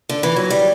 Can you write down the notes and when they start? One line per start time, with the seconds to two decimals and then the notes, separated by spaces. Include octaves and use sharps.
0.09 D3
0.23 E3
0.36 F#3
0.50 G3